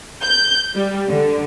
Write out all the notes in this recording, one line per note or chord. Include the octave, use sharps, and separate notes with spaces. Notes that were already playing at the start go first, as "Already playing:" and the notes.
G6
G3
D3